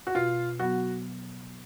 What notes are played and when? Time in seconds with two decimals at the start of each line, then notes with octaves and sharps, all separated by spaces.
0.07 F#4
0.15 B2 F4
0.59 F#3 B3 F#4